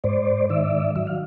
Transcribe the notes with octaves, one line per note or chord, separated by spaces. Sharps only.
G#2 C5 D5
D#3 D5 E5
F#3 E5
F5